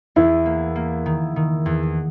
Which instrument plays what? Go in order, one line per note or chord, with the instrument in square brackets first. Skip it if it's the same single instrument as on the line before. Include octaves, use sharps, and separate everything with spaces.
[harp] E2 [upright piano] E4
[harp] A#3
A#3
D#3
D#3
E2